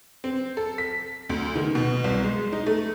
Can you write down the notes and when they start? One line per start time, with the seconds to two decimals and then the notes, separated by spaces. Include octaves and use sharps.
0.24 C4
0.57 A4
0.78 B6
1.29 D2
1.55 D#3
1.75 B2
2.04 C2
2.23 G#3
2.52 D#4
2.66 A3